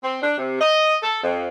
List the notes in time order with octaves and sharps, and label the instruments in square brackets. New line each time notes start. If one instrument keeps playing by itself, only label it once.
[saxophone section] C4
D4
C3
D#5
A4
F2